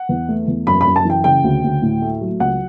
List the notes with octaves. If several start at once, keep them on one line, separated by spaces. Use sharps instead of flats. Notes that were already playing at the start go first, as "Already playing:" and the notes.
Already playing: F#5
E2
A3
E2
F#2 B5
B5
F#2
A5
E3 G5
C#3 G5
D2
D2
A2
A3
F#3
C#2 F#5